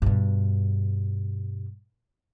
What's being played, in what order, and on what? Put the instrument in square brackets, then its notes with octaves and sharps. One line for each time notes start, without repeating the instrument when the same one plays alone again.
[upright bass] G2 B2